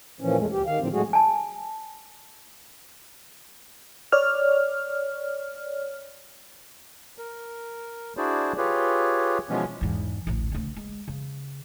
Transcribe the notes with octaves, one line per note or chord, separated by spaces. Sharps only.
A#2 E3 F3 C#4
F2 G#3 A3
D2 G4
D#3 F5
A2 D3 D#3 F3 C4
A2 F#3 G#3 A3 F#4 G#4
G#5 A5
C#5 D5 F6
A#4
D4 E4 F#4 G#4 C5 D5
F4 G4 G#4 B4 C#5
B2 E3 F3 G#3 B3 C#4
E2 G#2
A1 D2
D2 C#3
G#3
C#3